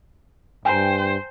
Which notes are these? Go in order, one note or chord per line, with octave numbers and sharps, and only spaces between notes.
G2 C5 G5 G#5 A#5